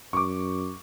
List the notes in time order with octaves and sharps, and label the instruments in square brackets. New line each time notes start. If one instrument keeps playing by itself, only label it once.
[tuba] F#2 [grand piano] C#6 D6